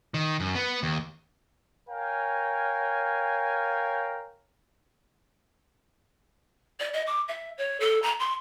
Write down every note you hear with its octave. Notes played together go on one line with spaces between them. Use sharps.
D#3
F#2
B3
D#2
A#4 C#5 F5 G5 G#5
D5
D#5
D6
E5
C#5
A4
A#5
C6